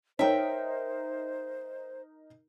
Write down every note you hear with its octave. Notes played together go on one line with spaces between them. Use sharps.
D#4 A#4 C5 C#5 E5 G5